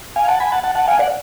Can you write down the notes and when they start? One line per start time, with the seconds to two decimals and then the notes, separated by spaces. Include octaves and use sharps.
0.16 F5 G#5
0.28 F#5 A5
0.40 G#5 B5
0.52 F#5 A5
0.63 F#5 A5
0.75 F#5 A5
0.87 F5 G#5
0.99 D5 F#5